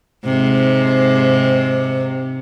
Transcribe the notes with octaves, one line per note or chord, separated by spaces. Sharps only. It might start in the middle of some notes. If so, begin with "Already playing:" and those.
G#2 C3